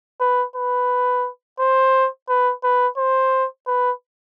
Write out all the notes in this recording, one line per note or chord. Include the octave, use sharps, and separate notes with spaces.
B4
B4
C5
B4
B4
C5
B4